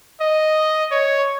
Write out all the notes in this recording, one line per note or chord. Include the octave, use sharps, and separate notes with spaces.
D#5
C#5